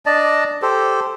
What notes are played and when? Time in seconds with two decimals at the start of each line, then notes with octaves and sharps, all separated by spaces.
0.06 D4 D5 D#5 A5
0.62 G4 A4 C5